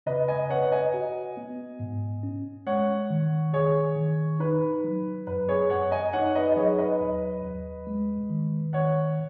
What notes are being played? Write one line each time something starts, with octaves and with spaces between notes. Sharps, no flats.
C#3 B4 D#5
D#5 G#5
B4 C#5 F#5
D#5 G#5
F#4
B3
G#2
C#4
G#3 C#5 F#5
D#3
D#3 G#4 C#5
D#3
D#4 B4
F#3
F#2 B4
G#4 C#5
F#2 C#5 F#5
D#5 G#5
D#4 C#5 F#5
B4 D#5
D#5
F#3 G#4 C#5
B4 D#5
D#2
D#2
G#3
D#3
D#3 C#5 F#5